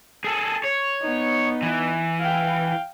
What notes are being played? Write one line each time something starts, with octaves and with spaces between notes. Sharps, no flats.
G#4 A4
C#5
B3 D#4
E3
F5 G5